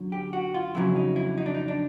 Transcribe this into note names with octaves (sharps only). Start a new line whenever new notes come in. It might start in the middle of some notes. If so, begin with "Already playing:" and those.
Already playing: F#2 D3 F#3
G4
F#4
F4
F2 C#3 F#3 E4
D#4
E4
D#4
D4
D#4
D4